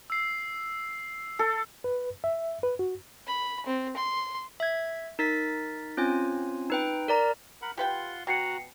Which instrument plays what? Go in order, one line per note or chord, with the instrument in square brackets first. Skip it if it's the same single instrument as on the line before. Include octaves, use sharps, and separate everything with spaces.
[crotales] E6 C7
[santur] A4
[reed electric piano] B4
E5
B4
F#4
[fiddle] B5
C4
C6
[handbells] E5 G#6
D#4 A#4 A6 B6
C4 C#4 F4 G#5
D#4 B4 G5
A#4 D5 A#5
[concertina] A#4 F#5 B5
[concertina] F4 F#5 C6 [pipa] G4 B4 G5
[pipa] B2 [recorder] F#4 [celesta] G5 C7 C#7 [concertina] A#5